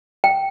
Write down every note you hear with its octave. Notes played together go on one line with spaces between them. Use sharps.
G5